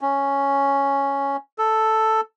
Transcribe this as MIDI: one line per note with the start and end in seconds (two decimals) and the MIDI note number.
0.01 1.37 61
1.58 2.21 69